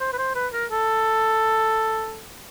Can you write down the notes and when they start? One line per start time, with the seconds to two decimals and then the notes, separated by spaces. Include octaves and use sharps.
0.01 C5
0.13 B4
0.18 C5
0.35 B4
0.53 A#4
0.71 A4